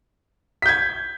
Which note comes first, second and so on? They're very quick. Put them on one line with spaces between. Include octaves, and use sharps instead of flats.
B6 G6 G#6